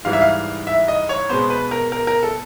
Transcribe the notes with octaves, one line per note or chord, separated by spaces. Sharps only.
G#2 E3 G3 F5
E5
F5
E5
D#5
C#5
B2 G#3 B3 C5
B4
A#4
A#4
A#4
A4